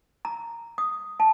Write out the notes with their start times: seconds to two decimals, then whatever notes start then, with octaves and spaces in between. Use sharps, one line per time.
0.25 A#5
0.78 D#6
1.20 A5